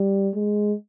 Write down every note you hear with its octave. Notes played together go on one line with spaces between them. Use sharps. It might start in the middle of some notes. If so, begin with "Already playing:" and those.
Already playing: G3
G#3